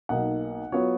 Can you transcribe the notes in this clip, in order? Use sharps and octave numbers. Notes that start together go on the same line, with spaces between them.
B1 B2 A#3 D#4 F#5
F#3 B3 F4 C#5